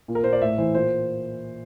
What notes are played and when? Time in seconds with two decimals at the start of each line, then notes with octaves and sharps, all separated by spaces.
0.08 A#2
0.15 A#4
0.24 A#2 C5
0.33 D5
0.41 A2 E5
0.58 E3 C5
0.74 A#2 C5